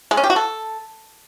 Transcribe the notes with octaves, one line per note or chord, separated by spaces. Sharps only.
G#3
C#4
G4
F#4
A4